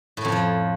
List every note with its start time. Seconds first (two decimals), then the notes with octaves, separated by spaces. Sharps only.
0.17 A2
0.25 F2
0.32 F3